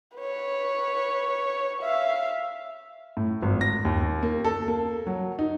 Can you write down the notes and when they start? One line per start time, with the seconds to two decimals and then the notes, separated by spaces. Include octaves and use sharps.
0.18 B4 C#5
1.82 E5 F5
3.17 A2
3.42 G#1
3.61 A#6
3.85 D#2
4.23 A#3
4.45 A4
4.68 A#3
5.07 F#3
5.39 D#4